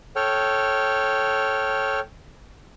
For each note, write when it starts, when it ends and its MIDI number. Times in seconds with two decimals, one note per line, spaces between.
0.16 2.00 69
0.16 2.00 73
0.16 2.00 79
0.16 2.00 89